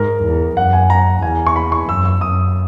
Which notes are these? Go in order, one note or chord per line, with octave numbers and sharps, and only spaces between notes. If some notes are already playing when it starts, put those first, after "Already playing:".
Already playing: G#2 A#4
E2
F#2 F#5
G#5
A#5
E2 G#5
C#6
B5
C#6
F#2 E6
E6
F#2 D#6